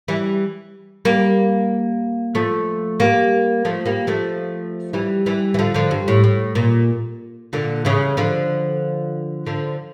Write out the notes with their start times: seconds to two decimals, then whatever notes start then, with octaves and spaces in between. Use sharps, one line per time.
0.08 E3 G3
1.05 G3 A#3
2.35 F3 A3
3.00 G3 A#3
3.65 F3 A3
3.86 G3 A#3
4.07 F3 A3
4.93 E3 G3
5.26 E3 G3
5.54 E3
5.59 D3 F3
5.74 D3 F3
5.91 G2
6.08 A2
6.24 A2
6.55 A#2
7.53 A#2 D3
7.85 C#3 E3
8.17 D3 F3
9.46 D3 F3